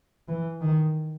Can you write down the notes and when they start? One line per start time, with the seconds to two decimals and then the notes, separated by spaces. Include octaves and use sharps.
0.28 E3
0.61 D#3